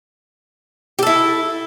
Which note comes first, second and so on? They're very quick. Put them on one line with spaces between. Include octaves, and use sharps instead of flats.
G4 A4 E4